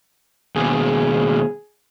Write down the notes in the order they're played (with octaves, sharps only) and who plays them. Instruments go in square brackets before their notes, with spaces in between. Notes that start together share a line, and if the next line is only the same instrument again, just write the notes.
[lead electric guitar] D#2 B2 [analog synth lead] G#4